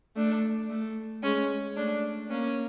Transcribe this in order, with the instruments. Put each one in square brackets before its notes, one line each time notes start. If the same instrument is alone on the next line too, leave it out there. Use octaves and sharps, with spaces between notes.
[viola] A3 [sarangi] D4
[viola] A3
[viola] G#3 [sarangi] C#4
[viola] A3 [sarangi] D4
[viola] A#3 [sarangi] C#4